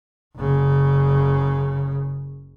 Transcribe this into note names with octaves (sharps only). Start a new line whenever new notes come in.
F#1 C#3